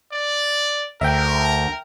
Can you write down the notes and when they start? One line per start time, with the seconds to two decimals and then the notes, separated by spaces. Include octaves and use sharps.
0.12 D5
1.01 D2 A#4 E5 G5